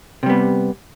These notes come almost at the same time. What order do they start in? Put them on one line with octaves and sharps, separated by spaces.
C3 G3 B3